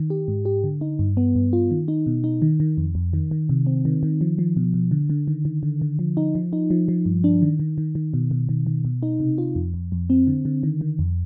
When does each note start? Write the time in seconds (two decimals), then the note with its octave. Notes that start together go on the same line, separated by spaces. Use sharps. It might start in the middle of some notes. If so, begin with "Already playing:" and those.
Already playing: D#3
0.10 G4
0.28 G#2
0.45 G4
0.64 D3
0.81 D#4
0.99 G2
1.17 B3
1.35 G2
1.53 F4
1.71 D#3
1.88 D#4
2.07 B2
2.24 D#4
2.42 D#3
2.60 D#3
2.78 F2
2.95 F2
3.13 D#3
3.31 D#3
3.49 C3
3.66 C4
3.85 D#3
4.03 D#3
4.21 F3
4.39 F3
4.57 B2
4.74 B2
4.91 D3
5.10 D3
5.28 D#3
5.45 D#3
5.63 D3
5.82 D3
5.99 F3
6.17 D#4
6.35 F3
6.53 D#4
6.70 F3
6.88 F3
7.06 G2
7.24 D4
7.42 D#3
7.60 D#3
7.78 D#3
7.95 D#3
8.14 B2
8.31 B2
8.49 D#3
8.67 D#3
8.85 B2
9.03 D#4
9.20 C3
9.38 F4
9.56 F2
9.74 F2
9.92 F2
10.10 C4
10.27 D3
10.45 D3
10.63 D#3
10.81 D#3
10.99 F2